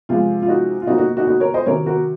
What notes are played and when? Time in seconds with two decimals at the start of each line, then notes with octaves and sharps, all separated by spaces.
0.09 C3 F3 G#3 F4
0.42 F4
0.48 D#4 F#4
0.82 F4
0.87 C3 F#3 A#3 D#4 F#4
0.98 D#4 F#4
1.17 D#4 F#4
1.27 D#4 F#4
1.40 A#4 C#5
1.54 C5 D#5
1.66 C3 D#3 F#3 A#4 C#5
1.86 F#4 A#4